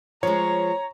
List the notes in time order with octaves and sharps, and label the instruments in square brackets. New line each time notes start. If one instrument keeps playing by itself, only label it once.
[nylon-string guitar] F3 G#3 [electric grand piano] C#5 [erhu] A#5